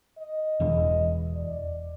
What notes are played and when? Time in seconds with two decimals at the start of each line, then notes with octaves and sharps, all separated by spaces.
0.18 D#5
0.60 E1 E3
1.35 D5